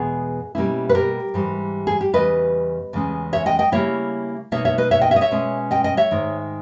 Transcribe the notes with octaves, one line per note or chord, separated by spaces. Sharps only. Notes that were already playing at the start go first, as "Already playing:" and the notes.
Already playing: E2 B2 G#3 B3 G#4
B2 G3 A#3 C#4 E4
B4
G4 A#4
G#2 E3 G3
G#4
G4
E2 C#3 G3 B4 D#5
E2 C#3 G#3 C#4
C#5 E5
D#5 G5
D#5 G5
C#3 G3 A#3 E4 C#5 E5
B2 A#3 D#4 C#5 E5
C#5 E5
B4 D#5
C#5 E5
D#5 G5
C#5 E5
D#5
C#5 E5
B2 G#3 C#4
D#5 G5
D#5 G5
C#5 E5
G#2 D#3 G#3